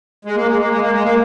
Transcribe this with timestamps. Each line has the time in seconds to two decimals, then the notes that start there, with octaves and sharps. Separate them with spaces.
0.25 G#3
0.36 A#3
0.47 G#3
0.58 A#3
0.69 G#3
0.80 A#3
0.92 G#3
1.03 A#3